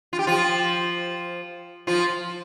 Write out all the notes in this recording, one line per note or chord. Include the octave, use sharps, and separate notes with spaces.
F4
G4
F3 F4
F3 F4